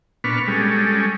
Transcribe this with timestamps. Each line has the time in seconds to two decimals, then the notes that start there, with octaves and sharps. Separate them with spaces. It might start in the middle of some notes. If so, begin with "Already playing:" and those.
0.24 A#2 B3 D4 B4 C#6 F6
0.48 G3 G#3 C#4 A4